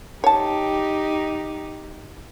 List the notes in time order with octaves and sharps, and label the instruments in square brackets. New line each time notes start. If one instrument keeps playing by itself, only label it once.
[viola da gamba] D#4 G4 [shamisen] C#5 A5